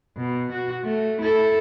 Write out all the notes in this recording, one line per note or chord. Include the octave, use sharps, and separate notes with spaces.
B2
F#4
A3
E4 A4